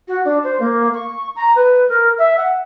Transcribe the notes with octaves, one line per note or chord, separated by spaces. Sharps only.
F#4
D4
C5
A#3
C#6
A#5
B4
A#4
E5
F#5